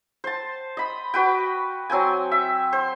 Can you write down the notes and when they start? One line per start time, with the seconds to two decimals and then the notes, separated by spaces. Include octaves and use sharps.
0.24 C5 A5
0.77 D#5 B5
1.14 F#4 B4 G5
1.90 F#3 C4 G5 G#5
2.31 E5
2.73 C5